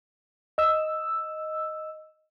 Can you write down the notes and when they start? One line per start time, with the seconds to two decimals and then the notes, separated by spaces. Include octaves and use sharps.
0.58 D#5 E6